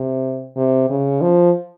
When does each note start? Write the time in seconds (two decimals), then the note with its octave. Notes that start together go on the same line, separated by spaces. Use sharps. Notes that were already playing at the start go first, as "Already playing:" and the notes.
Already playing: C3
0.56 C3
0.90 C#3
1.22 F3